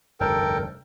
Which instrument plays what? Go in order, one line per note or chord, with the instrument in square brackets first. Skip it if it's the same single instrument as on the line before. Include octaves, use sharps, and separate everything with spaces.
[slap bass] F1 D2 G2 [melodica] A4 A#4 G5